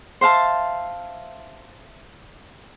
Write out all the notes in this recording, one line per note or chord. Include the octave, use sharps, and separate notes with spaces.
C5 E5 F5 A5